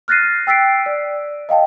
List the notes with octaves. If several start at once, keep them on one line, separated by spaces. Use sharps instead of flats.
F6 F#6 A6 A#6 C7 D#7
G5 E6 A6 B6 C7 D7
D5
D#5 F5 G5 A5